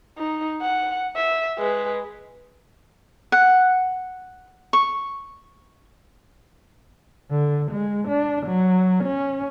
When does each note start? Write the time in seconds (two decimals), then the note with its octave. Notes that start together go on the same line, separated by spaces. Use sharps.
0.18 D#4
0.62 F#5
1.16 E5
1.58 G#3 B4
3.32 F#5
4.73 C#6
7.31 D3
7.72 G#3
8.08 D4
8.47 F#3
9.04 C#4